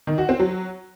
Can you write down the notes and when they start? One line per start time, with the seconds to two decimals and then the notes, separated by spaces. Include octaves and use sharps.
0.07 D#3
0.18 F#4
0.29 C4
0.40 F#3